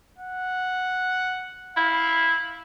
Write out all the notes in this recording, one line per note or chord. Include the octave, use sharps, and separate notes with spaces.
F#5
E4 F5